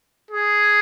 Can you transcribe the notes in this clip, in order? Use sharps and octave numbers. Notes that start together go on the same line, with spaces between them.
G#4